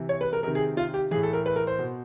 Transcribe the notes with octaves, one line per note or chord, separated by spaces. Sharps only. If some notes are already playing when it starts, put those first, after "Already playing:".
Already playing: C3 E3
C#5
B4
A#4
C3 D#3 A#4
G#4
F4
G4
A2 E3 G#4
A4
A#4
B4
A#4
C5
B2